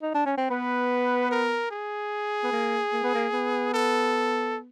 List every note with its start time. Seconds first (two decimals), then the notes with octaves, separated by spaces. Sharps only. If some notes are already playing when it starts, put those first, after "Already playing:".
0.02 D#4
0.15 D4
0.26 C#4
0.38 C4
0.50 B3 B4
1.31 A#4
1.71 G#4
2.44 B3
2.52 A#3
2.93 A#3
3.03 B3
3.15 A#3
3.33 B3
3.74 A4